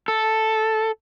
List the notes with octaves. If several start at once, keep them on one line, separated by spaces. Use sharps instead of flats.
A4